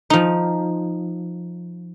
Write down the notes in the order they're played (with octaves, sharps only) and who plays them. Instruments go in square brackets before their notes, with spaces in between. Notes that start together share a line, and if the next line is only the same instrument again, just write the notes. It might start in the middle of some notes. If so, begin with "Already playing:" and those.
[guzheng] F3 D#4